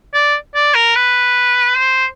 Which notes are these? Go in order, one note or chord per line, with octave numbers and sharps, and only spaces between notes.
D5
D5
A#4
B4
C5